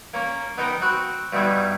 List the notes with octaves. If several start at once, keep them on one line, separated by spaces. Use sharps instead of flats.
A#3 C#4 A#4
B3 D#4 A#4 C5 D#5 G5
C4 F#4 F#5 B5 C6
G2 B2 G3 D#4 E4